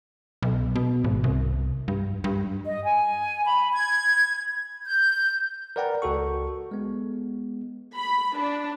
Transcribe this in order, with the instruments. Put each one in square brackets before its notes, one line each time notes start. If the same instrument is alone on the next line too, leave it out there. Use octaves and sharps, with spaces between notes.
[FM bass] B1
B2
G#1
C2
G2
G2
[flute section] D#5
G#5
B5
G#6
G6
[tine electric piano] A#4 B4 D5 F#5 G5 A#5
C#2 F#4 A4 C#6
G#3 B3
[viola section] B5
D4